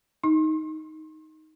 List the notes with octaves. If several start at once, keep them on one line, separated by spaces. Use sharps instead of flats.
D#4